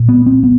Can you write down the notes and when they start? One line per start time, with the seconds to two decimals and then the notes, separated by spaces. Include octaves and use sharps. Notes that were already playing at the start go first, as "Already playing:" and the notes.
Already playing: A#2
0.08 B3
0.26 C4
0.43 B3